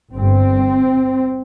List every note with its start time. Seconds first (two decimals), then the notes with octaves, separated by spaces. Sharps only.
0.15 G1 G2 C4